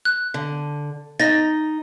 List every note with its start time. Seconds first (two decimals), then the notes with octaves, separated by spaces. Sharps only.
0.05 F#6
0.34 D3
1.20 D#4 A6 A#6